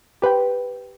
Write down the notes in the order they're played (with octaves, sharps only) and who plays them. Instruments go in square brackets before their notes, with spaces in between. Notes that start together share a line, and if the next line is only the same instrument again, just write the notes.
[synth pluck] G4 B4 C5 G5